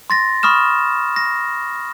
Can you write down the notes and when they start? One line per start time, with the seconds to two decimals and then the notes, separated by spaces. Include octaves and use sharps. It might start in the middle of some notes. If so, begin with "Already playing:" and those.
0.10 C6 A6 A#6
0.43 B5 C#6 D#6 F6 E7
1.16 A#6